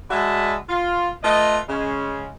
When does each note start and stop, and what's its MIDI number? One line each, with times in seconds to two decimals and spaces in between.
0.10 0.54 56
0.10 0.54 66
0.10 0.54 74
0.10 0.54 76
0.10 0.54 81
0.10 0.54 83
0.69 1.10 65
1.24 1.58 57
1.24 1.58 65
1.24 1.58 71
1.24 1.58 75
1.69 2.30 49
1.69 2.30 56
1.69 2.30 61